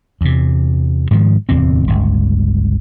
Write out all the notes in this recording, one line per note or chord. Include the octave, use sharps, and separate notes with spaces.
E2 C3
G#2 D#3 F3
D1 E2 C3 C4
G1 C#2